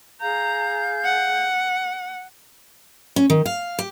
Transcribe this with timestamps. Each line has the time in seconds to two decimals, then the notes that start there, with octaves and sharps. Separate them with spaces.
0.21 G#4 F5 A#5 G6
1.05 F#5
3.16 C#4
3.30 D#3
3.46 F5
3.79 G4